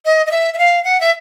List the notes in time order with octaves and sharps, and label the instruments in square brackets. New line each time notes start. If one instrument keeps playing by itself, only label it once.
[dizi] D#5
D#5
E5
E5
F5
F#5
E5